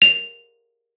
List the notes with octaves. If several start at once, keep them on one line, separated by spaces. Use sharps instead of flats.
F7